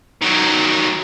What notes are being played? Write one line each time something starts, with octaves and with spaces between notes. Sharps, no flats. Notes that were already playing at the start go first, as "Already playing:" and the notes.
D#3 F#3